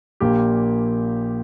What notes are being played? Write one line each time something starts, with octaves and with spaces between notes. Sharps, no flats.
A#1 A#2 A#3 G4